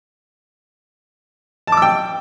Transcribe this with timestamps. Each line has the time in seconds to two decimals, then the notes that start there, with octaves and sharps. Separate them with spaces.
1.67 A5
1.72 D6
1.77 E6
1.82 G5